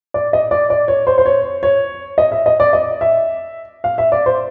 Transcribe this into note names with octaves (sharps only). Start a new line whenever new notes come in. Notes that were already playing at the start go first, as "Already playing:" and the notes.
D5
D#5
D5
D5
C#5
C5
C5
C#5
C#5
D#5
E5
D#5
D5
D#5
E5
F5
E5
D5
C5